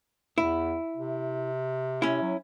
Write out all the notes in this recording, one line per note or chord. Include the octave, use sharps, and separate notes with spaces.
E2 E4
C3
C#4 E4
F#3